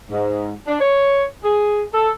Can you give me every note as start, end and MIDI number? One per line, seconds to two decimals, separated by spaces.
0.11 0.53 44
0.67 0.80 62
0.81 1.24 73
1.44 1.82 68
1.94 2.09 69